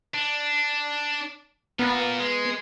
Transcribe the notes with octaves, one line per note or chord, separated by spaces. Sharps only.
D4
A#2 B3 A#4
G#3